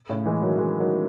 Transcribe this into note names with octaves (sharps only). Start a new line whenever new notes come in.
A2 C#3
E3 G#3
D#3 F#3
E3 G#3
D#3 F#3